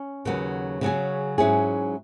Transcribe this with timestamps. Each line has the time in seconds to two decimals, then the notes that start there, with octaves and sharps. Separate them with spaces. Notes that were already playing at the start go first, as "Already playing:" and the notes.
Already playing: C#4
0.25 D#2 C#3 F#3 B3
0.81 C#3 F#3 C#4 G#4
1.38 G#2 F#3 C#4 E4 G#4